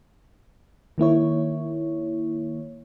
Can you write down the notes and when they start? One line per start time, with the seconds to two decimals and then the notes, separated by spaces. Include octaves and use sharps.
0.98 D#3 A#3 E4 C#5